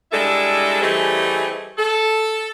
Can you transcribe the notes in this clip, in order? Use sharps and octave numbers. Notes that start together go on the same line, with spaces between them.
G3 G#3 D4 E4 A4
E3 G3 A3 C4 G#4 D#5
A4